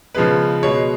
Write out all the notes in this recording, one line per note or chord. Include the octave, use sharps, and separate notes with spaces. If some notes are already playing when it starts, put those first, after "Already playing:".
C#3 F3 G#3 B3 B4
B2 G#3 B3 C#5